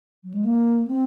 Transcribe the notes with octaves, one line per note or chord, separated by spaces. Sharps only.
F#3
G#3
A#3
C4